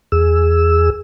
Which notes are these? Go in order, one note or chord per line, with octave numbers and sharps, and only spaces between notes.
E2 G#4 E6